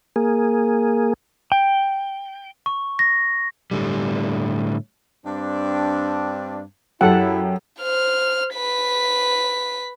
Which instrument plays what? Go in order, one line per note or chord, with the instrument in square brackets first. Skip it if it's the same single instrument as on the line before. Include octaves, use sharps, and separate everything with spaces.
[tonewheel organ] A#3 G#4
[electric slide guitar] G5
[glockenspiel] C#6
A#6
[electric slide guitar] A2 D3 G3
[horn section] G2 C4 D4
[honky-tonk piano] F#2 G4 [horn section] E4 [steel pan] A4 F#5
[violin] C5 F6
B4 B6